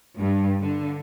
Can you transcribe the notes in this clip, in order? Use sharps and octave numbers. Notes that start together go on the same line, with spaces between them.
G2
D3